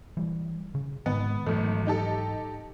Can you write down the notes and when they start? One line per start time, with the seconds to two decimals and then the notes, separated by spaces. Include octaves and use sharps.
0.17 E3 G3
0.75 C#3
1.06 G#2 D#3 G#3 B3
1.46 G#1 G#2 E3 F#3 A3
1.87 D#4 G4 A4